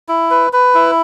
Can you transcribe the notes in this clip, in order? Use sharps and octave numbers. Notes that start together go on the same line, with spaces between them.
E4
B4
B4
E4